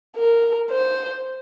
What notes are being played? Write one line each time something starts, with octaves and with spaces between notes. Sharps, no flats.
A#4
C5